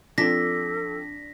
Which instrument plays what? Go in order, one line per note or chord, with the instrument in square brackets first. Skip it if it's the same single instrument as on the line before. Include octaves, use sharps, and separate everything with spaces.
[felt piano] F3 C4 [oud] D4 [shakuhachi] A4 [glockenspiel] A#6 B6